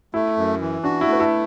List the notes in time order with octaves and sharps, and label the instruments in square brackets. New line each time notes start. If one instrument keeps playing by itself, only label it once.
[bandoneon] A3 [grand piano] E4
[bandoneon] F#2
E3
[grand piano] D4 [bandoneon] F#4
[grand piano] E4
[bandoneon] A3
[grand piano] B4
E4 A4